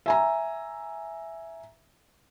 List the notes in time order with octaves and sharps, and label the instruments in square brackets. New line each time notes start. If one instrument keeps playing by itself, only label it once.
[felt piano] E5 G#5 A#5